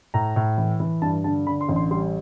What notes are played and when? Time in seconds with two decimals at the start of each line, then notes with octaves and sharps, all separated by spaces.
0.14 A2 A#5
0.36 A2
0.58 E3
0.80 E3
1.02 G2 A5
1.24 D3 A5
1.47 D3 B5
1.61 C6
1.69 A1
1.76 C6
1.91 G3 C6